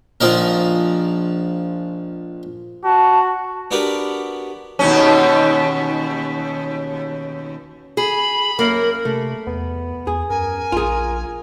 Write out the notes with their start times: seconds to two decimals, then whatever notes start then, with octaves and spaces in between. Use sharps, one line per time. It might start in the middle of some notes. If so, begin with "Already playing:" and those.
0.21 A#1 F3 D#4 A#4
2.84 F#4 A5
3.71 B3 D4 F#4 G4 A#4 B4
4.79 D#2 B2 C#4
7.97 G#4 B5
8.59 F#2 A#3 A#4
9.05 C3 A3
9.47 E2 B3
10.07 E2 G#4
10.30 F#2 A#4 G#5
10.72 A#1 F4 G#4